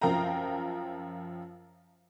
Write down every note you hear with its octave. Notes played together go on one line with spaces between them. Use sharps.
F#2 F3 A#4 F5 G5 A#5